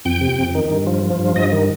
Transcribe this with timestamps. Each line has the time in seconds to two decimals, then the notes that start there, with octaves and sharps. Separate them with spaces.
0.05 F2 G5
0.21 C3
0.39 F2
0.55 D#3
0.70 G2
0.87 F3
1.03 F3
1.19 G2
1.36 G2 D#5
1.52 D#3